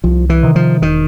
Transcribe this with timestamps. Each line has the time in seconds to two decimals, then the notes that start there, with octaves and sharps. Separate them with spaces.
0.04 C2 F3
0.30 E3
0.43 C3 D#3
0.56 F3
0.82 E1 D#3